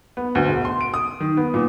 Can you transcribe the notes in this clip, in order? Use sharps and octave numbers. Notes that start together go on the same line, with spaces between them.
B3
D2
E1
C6
D7
D#6
D#3
B3
A#2